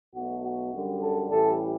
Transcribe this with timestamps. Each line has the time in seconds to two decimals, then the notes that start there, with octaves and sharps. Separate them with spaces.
0.14 B1 B2 F#3 A3 F#4
0.43 F#4
0.72 F#2 D3 G3
1.01 A4
1.30 A1 A2 E3 G3 A4